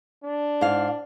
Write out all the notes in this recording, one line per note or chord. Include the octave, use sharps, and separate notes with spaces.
D4
G#2 F5